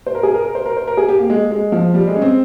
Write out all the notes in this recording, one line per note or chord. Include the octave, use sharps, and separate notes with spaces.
C5
A#4
G#4
A#4
A#4
C5
A#4
C5
A#4
G#4
G4
A#3
G#3
G#3
F3
G3
G#3
C#4
C4